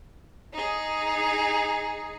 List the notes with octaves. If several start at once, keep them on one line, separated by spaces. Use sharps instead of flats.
D#4 G#4